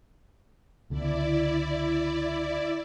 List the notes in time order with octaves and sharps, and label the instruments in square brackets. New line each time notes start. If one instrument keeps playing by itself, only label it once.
[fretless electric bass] C#2 D3 B3 [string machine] E4 D5